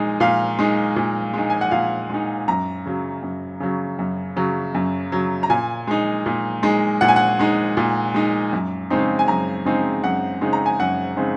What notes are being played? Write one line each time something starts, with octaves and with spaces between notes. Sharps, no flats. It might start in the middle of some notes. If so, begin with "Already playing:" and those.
Already playing: A#2 G#3 D#4
A#2 F5
G#3 D#4
A#2
G#3 D#4
G#5
F#5
A#2 F5
G#3 D#4
F#2 A#5
C#3 F#3
F#2
C#3 F#3
F#2
C#3 F#3
F#2
C#3 F#3
A#5
A#2 G#5
G#3 D#4
A#2
G#3 D#4
A#2 F#5
G#5
F#5
G#3 D#4
A#2
G#3 D#4
F#2
C#3 G#3 C4 D#4
G#5
F#2 A#5
C#3 G#3 C4 D#4
F#2 F#5
C#3 G#3 C4 D#4
A#5
G#5
F#2 F#5
C#3 G#3 C4 D#4